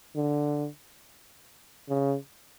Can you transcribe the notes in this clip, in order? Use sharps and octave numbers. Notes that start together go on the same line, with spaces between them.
D3
C#3